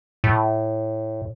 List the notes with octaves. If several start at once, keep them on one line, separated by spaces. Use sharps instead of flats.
A2